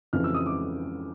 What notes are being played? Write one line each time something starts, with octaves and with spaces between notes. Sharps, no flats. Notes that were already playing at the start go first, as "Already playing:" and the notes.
F2 C#3 E3 F6
E6
D#6
D6